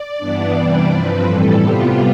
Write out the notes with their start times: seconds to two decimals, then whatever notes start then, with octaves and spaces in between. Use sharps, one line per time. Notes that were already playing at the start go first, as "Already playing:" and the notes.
Already playing: D5
0.18 G2 E3 B3 D4
0.53 C3 E3 G3 D4
0.89 G2 F3 C4 B4
1.25 A2 E3 G3 A4
1.59 C3 G3 B3 F4